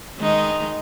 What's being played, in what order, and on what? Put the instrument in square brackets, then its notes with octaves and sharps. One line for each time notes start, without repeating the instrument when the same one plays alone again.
[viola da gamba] D#3 G#3 D#4